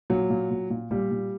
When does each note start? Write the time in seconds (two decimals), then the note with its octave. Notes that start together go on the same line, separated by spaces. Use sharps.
0.10 A#2 F#3
0.30 A#2
0.50 A#2
0.70 A#2
0.91 A#2 G3
1.11 A#2